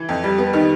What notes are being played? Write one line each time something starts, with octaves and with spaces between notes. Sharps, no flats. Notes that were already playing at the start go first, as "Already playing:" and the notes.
Already playing: E3
F2
G3
B3
D#3